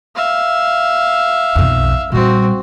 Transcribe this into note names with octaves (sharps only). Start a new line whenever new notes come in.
E5 F5
B1 F2
A#2 G3 C4 F#4